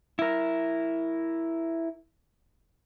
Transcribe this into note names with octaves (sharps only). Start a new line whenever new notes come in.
E4 A#4